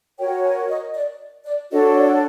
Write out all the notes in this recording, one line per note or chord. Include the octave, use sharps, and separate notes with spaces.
F#4 A#4 C#5 G5
G#5
D#5
D5
D5
D4 F#4 A4 C#5 D#5
D5